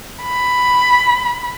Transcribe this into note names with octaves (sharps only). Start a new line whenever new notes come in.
B5